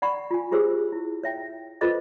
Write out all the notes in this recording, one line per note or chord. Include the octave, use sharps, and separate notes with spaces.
D5 F#5 B5 C#6
F4 G#5
F4 G4 G#4 C5 C#5 E6
E4
C#5 E5 G5
F4 A4 B4 C5 D#5 D6